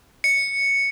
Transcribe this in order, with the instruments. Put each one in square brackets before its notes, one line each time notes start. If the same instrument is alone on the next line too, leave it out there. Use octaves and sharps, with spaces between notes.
[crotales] C#7